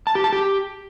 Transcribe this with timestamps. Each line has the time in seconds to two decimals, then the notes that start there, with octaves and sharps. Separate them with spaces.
0.07 A5
0.15 G4
0.24 A5
0.33 G4